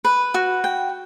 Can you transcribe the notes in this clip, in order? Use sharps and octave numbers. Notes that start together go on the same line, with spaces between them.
B4
F#4
G5